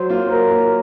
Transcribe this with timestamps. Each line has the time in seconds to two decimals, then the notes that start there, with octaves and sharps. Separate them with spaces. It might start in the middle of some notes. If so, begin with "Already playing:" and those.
Already playing: F#3 C5
0.09 A#3 F4
0.30 F#3 A#4
0.51 A#3 F4